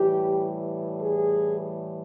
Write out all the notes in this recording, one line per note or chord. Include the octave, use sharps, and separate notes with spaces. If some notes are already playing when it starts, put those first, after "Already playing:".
Already playing: A2 E3 G3 G4
G#4